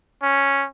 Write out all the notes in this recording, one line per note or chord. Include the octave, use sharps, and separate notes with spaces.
C#4